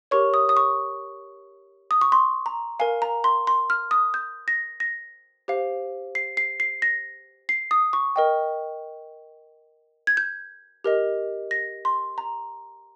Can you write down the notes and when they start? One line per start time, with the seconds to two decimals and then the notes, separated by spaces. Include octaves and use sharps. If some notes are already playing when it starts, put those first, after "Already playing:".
0.11 G4 A#4 C#5 C#6
0.34 D#6
0.49 D#6
0.57 C#6
1.91 D#6
2.01 C#6
2.12 C6
2.46 A#5
2.80 A#4 F5 G#5
3.02 A#5
3.24 C6
3.47 C6
3.70 F6
3.91 D#6
4.14 G6
4.48 A#6
4.80 A#6
5.48 G4 C5 F5
6.15 C7
6.37 C7
6.60 C7
6.82 A#6
7.49 C7
7.71 D#6
7.93 C#6
8.16 A#4 D#5 G5
10.07 G#6
10.17 G6
10.84 G4 A#4 D#5
11.51 A#6
11.85 C6
12.18 A#5